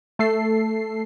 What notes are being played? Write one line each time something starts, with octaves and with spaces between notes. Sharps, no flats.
A3 A4 C7